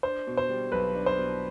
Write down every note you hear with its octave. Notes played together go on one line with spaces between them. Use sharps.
D4 C5
B2
C5
G3
B1 B4
D4
C5
B2